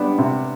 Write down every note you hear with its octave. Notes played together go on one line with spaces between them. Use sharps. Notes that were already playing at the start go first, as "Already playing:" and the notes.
Already playing: G3 B3 D4
C3